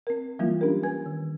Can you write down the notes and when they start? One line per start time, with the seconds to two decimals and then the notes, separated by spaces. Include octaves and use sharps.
0.07 C4 A#4
0.39 E3 F#3 G3 A#3 E4 F4
0.61 C#4 D4 G4 A#4
0.83 B4 G#5 G#6
1.06 D#3